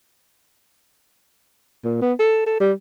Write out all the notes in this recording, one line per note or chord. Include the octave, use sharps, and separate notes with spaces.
A#2
B3
A4
A4
G3